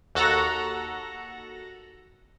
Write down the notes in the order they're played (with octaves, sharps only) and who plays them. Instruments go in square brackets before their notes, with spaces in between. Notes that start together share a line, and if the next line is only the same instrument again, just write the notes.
[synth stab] D#2 F#4 A4 F#5 A#5 A#6